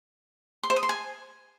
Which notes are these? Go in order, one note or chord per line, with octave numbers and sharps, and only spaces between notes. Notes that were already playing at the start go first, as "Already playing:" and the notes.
C6
C5
D#6
C6
G#5